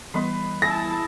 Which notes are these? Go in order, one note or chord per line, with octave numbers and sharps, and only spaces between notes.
E3 G3 B3 B4 D#5 C6
E4 G#4 A5 E6 A#6